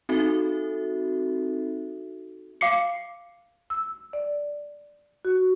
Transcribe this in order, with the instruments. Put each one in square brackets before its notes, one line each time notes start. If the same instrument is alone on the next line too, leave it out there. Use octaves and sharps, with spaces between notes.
[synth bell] C4 D#4 F#4 A4 E5
[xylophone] F5 D6 C7 C#7
[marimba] E6
D5
F#4